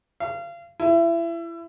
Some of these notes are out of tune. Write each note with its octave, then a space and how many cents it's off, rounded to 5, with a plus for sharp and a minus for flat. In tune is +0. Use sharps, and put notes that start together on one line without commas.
F5 -30
E4 +30